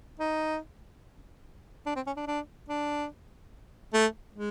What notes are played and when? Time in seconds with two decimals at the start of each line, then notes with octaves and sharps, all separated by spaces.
0.20 D#4
1.86 D4
1.96 C4
2.07 C#4
2.17 D4
2.27 D4
2.69 D4
3.94 A3
4.35 G#3